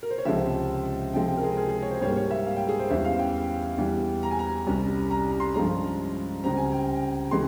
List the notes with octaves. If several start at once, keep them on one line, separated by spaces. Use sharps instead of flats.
A#4
C5
C#5
C#2 C3 F3 G#3 C4 E5
C3 F3 G#3 C4 G5
G5
A#4
G#4
G#4
G#4
C#5
C5
G#2 G3 A#3 C#5
C#5
E5
F5
G5
G#4
C5
E2 E3 G3 C#4 E5
F5
G5
E2 E3 G3
A#5
G#5
A#5
C2 C3 G3 C#4
A#5
A#5
C6
G2 F3 G#3 C#4 A#5
C#2 C#3 G3 C4 A#5
G#5
G5
C3 E3 G#3 C#4 C6